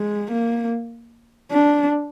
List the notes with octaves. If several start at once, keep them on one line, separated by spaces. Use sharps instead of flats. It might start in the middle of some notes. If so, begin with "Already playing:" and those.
Already playing: G#3
A#3
D4